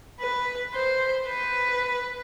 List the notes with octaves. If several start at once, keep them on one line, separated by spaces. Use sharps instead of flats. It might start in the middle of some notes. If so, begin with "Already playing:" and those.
B4
C5
B4